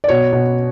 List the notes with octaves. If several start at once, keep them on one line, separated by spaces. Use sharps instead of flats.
D5
B2 C#5
B2